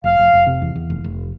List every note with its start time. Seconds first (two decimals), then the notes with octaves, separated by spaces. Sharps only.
0.04 F1 F5
0.19 F1
0.33 F1
0.47 C3
0.62 E2
0.75 E2
0.90 F1
1.04 F1